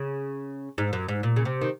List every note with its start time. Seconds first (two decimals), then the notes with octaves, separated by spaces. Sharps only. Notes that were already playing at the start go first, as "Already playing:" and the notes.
Already playing: C#3
0.78 G#2
0.93 F#2
1.08 G#2
1.23 A#2
1.36 C#3
1.45 C3
1.61 D#3